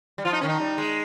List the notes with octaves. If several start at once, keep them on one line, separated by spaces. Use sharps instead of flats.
G3
F3 F4
D#4
D#3 C#4
D#4
G3
G#3